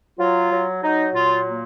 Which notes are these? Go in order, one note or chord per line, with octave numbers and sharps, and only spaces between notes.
F#3 F4
F#3
F#3 D#4
A#2 F4
A#3